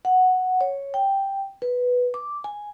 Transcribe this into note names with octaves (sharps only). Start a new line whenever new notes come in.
F#5
C#5
G5
B4
D6
G#5